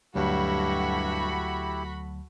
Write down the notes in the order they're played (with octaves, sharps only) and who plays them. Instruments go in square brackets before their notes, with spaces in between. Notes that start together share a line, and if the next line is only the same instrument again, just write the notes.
[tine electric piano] D2 F#3 [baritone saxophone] G2 [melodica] E4 G4 [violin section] F#4 A4 B5